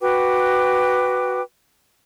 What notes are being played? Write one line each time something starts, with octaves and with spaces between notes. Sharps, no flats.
F#4 B4 G5 D6